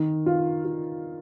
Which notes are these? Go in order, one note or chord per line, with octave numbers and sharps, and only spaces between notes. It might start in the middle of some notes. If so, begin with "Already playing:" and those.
Already playing: D#3
F4
F4